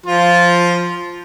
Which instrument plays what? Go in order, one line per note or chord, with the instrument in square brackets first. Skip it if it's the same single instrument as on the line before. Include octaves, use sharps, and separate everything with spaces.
[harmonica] F3 F4